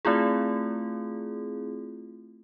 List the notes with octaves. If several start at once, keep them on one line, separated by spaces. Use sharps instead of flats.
A3 C4 E4 F4 G#4